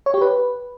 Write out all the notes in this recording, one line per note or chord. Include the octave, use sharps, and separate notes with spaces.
C#5
G4
B4